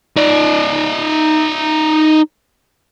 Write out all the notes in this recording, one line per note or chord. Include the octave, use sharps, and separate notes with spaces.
D#4 D5